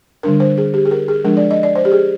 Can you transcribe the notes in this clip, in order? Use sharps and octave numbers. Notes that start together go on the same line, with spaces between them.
D3 G3 D4 A#4
C5
G#4
G4
G#4
A#4
G#4
F3 G#3 D4 A#4
D5
D#5
D5
C5
G4
G#4